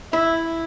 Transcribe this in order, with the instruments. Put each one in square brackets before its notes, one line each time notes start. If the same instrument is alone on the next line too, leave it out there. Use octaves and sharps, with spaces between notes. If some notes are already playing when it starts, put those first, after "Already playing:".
[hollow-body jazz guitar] E4 [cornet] E5